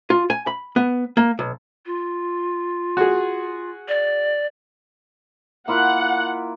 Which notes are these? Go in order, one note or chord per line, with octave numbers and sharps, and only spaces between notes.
F4
G#5
B5
B3
A#3
B1
F4
F#4 G#4
D5
A#3 E4 F4 F#5